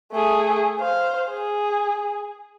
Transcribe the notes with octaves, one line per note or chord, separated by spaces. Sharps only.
A3 G#4
C5 F5
G#4